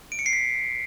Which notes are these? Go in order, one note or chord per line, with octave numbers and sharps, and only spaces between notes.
D7
C#7
C7
B6